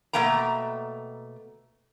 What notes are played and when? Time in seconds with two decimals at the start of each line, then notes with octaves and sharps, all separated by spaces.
0.13 B2 A3 A#3 G5 A#5